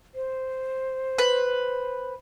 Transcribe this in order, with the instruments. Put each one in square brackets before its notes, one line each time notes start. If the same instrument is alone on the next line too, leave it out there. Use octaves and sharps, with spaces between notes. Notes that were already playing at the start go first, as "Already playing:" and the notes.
[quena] C5
[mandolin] B4